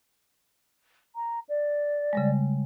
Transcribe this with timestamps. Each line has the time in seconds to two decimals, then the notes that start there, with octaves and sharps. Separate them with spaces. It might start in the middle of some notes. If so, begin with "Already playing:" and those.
1.15 A#5
1.49 D5
2.13 C#3 G3 G#3